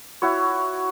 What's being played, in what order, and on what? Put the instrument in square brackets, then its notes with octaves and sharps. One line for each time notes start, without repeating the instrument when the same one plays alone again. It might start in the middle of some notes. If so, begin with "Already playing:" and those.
[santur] E4 F#4 C#5